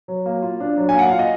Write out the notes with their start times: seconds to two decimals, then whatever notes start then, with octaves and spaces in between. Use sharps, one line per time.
0.08 F#3
0.26 A#3
0.43 F4
0.60 D4
0.77 F#3
0.89 G#5
0.94 A#3 F#5
1.09 F4 F5
1.19 D#5